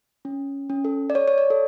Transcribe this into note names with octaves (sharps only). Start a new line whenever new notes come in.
C#4
C#4
A4
D5
C#5
C#5
D5
A4